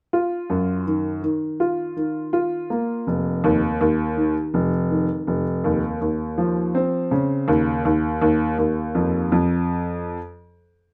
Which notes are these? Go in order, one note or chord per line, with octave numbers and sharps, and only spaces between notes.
F4
F#2
D#3
D#3
F4
D#3
F4
A#3
F1
D#2
D#2
D#3
F1
D#3
F1
D#2
D#2
F3
C4
C#3
D#2
D#2
D#2
D#2
F2
F2